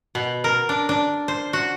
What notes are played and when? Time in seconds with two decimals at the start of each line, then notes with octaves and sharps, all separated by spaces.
0.15 B2
0.44 A#4
0.69 D4
0.89 D4
1.28 C5
1.53 F#4